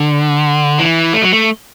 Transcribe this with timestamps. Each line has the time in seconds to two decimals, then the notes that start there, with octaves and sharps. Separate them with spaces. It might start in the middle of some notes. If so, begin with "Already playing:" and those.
Already playing: D3
0.79 E3
1.13 A3
1.22 F#3
1.32 A3